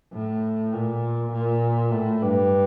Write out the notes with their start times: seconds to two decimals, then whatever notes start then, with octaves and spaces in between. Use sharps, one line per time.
0.13 A2
0.73 A#2
1.32 A#2
1.91 A2
2.22 G2